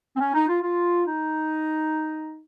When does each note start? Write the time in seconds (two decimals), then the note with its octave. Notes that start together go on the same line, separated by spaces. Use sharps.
0.16 C4
0.20 C#4
0.34 D#4
0.48 F4
0.62 F4
1.05 D#4